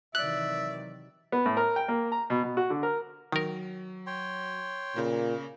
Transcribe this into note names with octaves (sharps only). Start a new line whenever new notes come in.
C3 D#3 E3 F#3 D5 E5 F#6
B3
A2
A#4
G5
A#3
A#5
B2
B2
F#4
D3
A#4
D#3 F#3 A#4
C#5 G5 C6
A#2 C#3 A#3